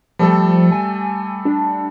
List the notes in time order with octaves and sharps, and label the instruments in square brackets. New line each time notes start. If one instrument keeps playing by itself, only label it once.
[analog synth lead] F3 [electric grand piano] G3 A3 A4
[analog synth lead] G#5
D4